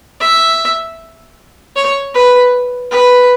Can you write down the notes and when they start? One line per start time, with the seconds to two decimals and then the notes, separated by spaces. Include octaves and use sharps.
0.20 E5
1.76 C#5
2.15 B4
2.91 B4